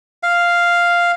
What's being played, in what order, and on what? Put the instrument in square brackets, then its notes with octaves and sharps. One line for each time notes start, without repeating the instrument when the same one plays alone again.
[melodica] F5